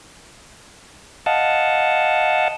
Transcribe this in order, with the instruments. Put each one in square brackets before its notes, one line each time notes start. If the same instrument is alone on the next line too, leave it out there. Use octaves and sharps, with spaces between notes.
[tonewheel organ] D#5 F5 F#5 A5